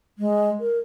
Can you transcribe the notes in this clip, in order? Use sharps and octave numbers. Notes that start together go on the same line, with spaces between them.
G#3
A#4